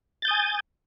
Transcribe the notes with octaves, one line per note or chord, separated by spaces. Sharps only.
G#5 D#6 G6 A6